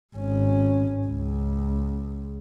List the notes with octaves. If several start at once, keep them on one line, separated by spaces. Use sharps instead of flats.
G#1 C#4
C#2